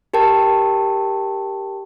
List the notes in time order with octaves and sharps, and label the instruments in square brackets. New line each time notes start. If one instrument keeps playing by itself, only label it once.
[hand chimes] G4 A#4 G5 A5